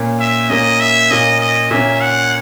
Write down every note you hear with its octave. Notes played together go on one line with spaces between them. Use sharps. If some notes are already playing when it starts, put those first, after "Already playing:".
Already playing: A#2 A#3 C#4
E5
A#2 A#3 C#4 D#5
E5
A#2 A#3 C#4 D#5
D#5
A#2 A#3 C#4 E5
F#5